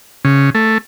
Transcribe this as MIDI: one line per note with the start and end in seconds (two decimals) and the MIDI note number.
0.25 0.50 49
0.55 0.78 57